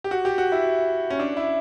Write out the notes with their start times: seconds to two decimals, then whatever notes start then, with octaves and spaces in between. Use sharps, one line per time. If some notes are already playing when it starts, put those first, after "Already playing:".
0.04 G4
0.11 F#4
0.25 G4
0.38 F#4
0.52 E4
1.10 C#4
1.19 D4
1.37 E4